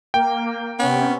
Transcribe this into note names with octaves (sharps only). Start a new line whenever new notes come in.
A#3 G5
C3 B3 C#4